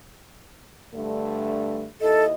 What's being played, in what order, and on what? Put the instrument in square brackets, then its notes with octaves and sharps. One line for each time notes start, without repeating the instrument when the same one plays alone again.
[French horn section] G2 D3 A3
[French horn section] D#2 E4 D#5 [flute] A4